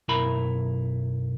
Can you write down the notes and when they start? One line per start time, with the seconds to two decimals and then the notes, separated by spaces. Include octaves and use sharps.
0.08 B1 F#2 E4 A#4 E5 B5